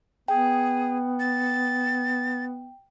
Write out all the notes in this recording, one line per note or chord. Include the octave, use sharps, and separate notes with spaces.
B3 G#4 G5
A6